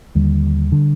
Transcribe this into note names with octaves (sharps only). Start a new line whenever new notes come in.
D#2 D3 G3
D3